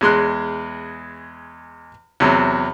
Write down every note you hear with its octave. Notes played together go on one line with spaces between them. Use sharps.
E2 G#3 C6 F#6
E2 C3 F#3